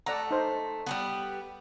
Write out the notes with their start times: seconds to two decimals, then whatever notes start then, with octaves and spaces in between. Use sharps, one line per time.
0.06 A3 D5 F#5 A#5
0.31 D#4 C5
0.87 G3 G#3 B3